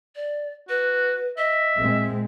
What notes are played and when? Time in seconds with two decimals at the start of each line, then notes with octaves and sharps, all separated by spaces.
0.16 D5
0.69 F#4 B4
1.38 D#5 E5
1.80 A#2 G#3 C4